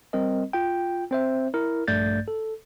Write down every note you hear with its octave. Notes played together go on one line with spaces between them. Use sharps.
G3 C4 A#4 D#5
F4 G5
C4 C5 E5
E4 A#4
A#1 G2 A3 D5 G6 A6
A4